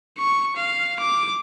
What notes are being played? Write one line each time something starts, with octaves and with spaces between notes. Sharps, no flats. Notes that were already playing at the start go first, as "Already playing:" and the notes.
C#6
F5
D6